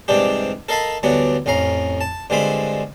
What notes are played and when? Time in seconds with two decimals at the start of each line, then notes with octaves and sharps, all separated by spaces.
0.08 G#2 C3 E3 G3 D4 G4
0.69 A4 A#4 D#5 F5 A5 B5
1.03 D2 E3 F#3 G3 B3 D4
1.46 A1 F2 C#4 F5 A#5
2.01 A5
2.30 G2 D3 G#3 C4 F4 B5